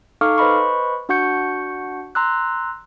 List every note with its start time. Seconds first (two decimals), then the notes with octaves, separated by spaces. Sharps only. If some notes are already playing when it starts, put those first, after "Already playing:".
0.21 D#4 A4 F5 C#6 D6 F6
0.38 B4 C5 D#5 B5 C#6
1.09 D4 F#4 F#5 C#6 G6 C#7
2.15 A#5 C6 E6 F#6